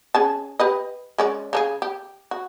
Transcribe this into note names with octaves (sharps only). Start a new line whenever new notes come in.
C#4 G#4 A5
G4 B4 D#5
G#3 C#4 D5
C#3 D4 G#4
G4
F#4